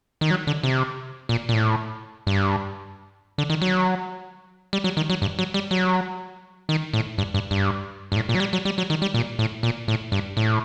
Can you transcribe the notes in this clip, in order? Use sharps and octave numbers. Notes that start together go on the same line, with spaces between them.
D#3
F#3
D3
C3
A#2
A#2
A2
G2
D3
D#3
F#3
G3
F#3
D#3
F#3
G2
F#3
G3
F#3
D#3
A2
G2
G2
G2
G2
A2
A#2
F#3
G3
F#3
G3
F#3
D#3
G3
A#2
A2
A#2
A2
G2
A2